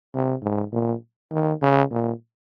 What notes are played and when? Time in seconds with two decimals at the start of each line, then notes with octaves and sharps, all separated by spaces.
0.14 C3
0.43 G#2
0.72 A#2
1.32 D#3
1.62 C#3
1.91 A#2